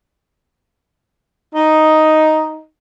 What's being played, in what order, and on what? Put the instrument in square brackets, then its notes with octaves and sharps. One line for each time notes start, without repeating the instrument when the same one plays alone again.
[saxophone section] D#4